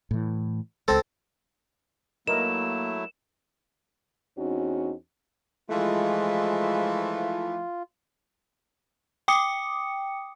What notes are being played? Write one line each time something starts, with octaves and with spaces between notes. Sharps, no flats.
A2 E3
C#2 G#3 C4 A4
F#3 A3 A#3 E4 A#4 B4 D#5 E7
E2 C4 C#4 D#4 F#4
E3 F3 G#3 A3 F4
G5 D6 D#6 C#7